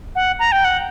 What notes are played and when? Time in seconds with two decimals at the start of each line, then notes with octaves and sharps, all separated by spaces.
0.15 F#5
0.39 A#5
0.52 G5
0.65 F#5